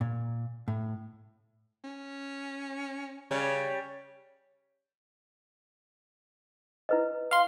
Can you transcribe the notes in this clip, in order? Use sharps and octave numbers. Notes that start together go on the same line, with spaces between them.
A#2
A2
C#4
C#3 G3 C#5
E4 B4 D#5
F5 C6